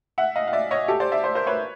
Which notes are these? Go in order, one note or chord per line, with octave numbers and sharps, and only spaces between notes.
E5 F#5
D#5 F5
F5
D5 E5
C#5 D#5
G4 A4
C5 D5
D5 E5
C5 D5
A#4 C5
B4 C#5